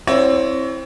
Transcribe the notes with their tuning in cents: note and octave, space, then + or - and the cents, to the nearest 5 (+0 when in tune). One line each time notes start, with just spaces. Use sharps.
C4 +20 E4 +0 C#5 +35